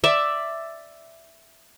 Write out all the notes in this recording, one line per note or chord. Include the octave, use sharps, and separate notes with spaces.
D5 E5